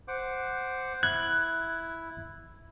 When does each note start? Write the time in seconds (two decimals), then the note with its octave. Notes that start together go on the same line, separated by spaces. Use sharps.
0.08 C5 F#5 D6
1.03 E4 F#6 G#6